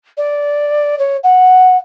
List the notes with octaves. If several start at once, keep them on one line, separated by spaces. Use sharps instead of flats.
D5
C#5
F#5